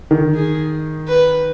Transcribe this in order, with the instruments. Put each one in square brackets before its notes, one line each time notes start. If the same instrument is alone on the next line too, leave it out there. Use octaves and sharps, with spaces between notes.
[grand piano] D#3
[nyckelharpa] G#4
B4